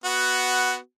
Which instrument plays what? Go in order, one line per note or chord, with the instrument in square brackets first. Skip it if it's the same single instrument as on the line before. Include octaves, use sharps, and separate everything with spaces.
[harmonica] B3 F#4